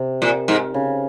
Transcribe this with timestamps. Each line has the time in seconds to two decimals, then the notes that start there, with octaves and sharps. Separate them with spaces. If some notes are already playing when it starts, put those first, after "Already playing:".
Already playing: C3
0.22 A#2
0.48 G#2
0.74 C#3